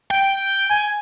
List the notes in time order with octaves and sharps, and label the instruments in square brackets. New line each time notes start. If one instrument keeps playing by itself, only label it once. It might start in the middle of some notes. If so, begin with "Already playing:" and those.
[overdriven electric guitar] G5
[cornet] G#5